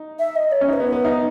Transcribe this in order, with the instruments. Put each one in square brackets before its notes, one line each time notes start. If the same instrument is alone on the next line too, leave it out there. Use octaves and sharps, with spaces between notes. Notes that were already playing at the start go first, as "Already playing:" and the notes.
Already playing: [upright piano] D#4
[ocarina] E5
D#5
C#5
[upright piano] C#4
[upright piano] D#4 [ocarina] C#5
[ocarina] B4
[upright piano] B3
B3
D#4